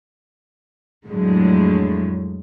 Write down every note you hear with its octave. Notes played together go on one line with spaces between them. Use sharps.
F2 A2 D3 F#3 G#3